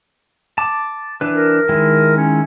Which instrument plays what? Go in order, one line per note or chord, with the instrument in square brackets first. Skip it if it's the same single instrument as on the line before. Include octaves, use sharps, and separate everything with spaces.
[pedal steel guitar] A5 D6
E3 D4 B4
[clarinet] A#4
[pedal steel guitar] D#3 G#3 E4
[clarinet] C#4